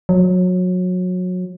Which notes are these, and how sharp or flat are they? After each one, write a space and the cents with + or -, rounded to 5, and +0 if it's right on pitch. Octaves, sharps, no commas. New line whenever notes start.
F#3 -25